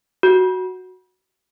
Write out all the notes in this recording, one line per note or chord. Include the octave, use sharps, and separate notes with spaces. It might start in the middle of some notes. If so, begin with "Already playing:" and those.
F#4